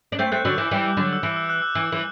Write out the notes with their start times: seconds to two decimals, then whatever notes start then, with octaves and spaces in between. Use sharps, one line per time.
0.12 D4
0.19 A3 C4 G6
0.32 A3 C4 F#6
0.45 D3 F#3 E6
0.58 E3 D6
0.71 E3 G3
0.97 D3 F#3
1.13 E6
1.23 E3 F#6
1.31 D6
1.37 E6
1.50 F#6
1.62 E6
1.75 E3 E6
1.92 E3